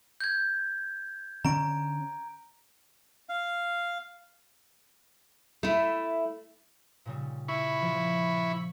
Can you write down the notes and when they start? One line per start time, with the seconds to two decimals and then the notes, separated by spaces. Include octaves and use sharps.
0.21 G6 G#6
1.45 D3 C#4 A#5 D7
3.29 F5
5.63 A3 E4
7.05 A#2 C#3 G3
7.48 E4 B5 C#6
7.82 F3